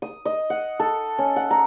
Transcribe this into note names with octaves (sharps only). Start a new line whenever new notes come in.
D#6
D#5
F#5
A4
C#4
F#5
A#5